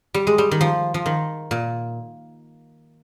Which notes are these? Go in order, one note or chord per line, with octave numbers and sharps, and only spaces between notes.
G3
G#3
G3
D#3
F3
F3
D#3
A#2